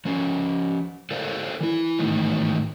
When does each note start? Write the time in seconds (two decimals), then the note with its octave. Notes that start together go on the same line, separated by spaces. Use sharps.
0.05 F3 C#4
1.11 A4 A#4 C5 D5 F5
1.61 E3 E4
1.99 G#2 D#3 E3 A3 B3 D#4